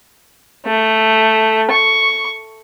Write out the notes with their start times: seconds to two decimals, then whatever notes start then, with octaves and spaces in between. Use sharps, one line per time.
0.66 A3
1.71 C#6